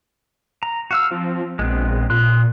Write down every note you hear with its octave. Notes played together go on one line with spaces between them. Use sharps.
A#5
F#4 F5 E6
F3 C4
A#1 G#3 B3 C4
A#2 C6 F#6